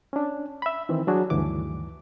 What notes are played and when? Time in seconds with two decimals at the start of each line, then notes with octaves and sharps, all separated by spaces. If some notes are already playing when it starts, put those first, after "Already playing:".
0.13 C#4 D4
0.62 E5 B5
0.89 D#3 E3 C4
1.07 F#3 D4 F#4 G#4
1.30 D2 G2 D#3 E3 D6